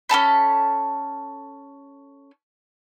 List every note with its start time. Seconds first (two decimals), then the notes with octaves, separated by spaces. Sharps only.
0.09 C#4 A4 A5 B5